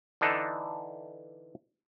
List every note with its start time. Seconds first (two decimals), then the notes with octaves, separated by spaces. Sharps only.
0.21 D3 E3 D4 D#4 A4